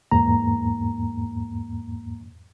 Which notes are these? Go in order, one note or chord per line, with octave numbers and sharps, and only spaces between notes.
E2 G#2 A#3 A#5